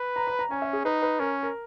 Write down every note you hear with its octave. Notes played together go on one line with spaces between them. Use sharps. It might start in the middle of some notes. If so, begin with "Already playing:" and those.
Already playing: B4
A#5
B5
A#5
C#4 G#5
E5
G#4
D#4 B4
B4
C#4 A#4
A#4